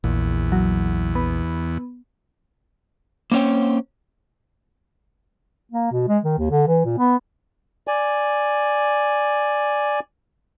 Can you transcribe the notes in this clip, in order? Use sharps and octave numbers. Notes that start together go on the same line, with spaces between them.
A#1 E2
F#3
B3
A#3 C4 C#4 C#5 G5
A#3
B2
G#3
D#3
D#2
D3
E3
A#2
B3
D5 G#5